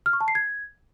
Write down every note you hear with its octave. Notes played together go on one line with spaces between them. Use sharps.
F6
C#6
A5
C7
G#6